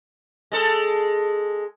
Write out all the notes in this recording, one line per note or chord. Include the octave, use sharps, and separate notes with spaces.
G#3 A4